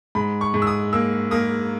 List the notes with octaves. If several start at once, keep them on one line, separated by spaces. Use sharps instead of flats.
G#2 B5
C#6
G#2
E6
D#6
A#3 E6
A#3 D#6